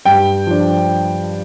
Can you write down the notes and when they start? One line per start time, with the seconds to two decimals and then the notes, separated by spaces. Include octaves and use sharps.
0.05 G2 G5
0.47 F3 D4